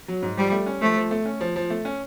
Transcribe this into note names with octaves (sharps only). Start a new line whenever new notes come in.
F#3
G#2
F3 G3
A3
C#4
F3 A3
F3
A3
C#4
F3
F3
A3
C#4